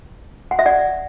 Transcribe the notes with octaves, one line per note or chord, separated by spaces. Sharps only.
F#5
E5
D5 F#5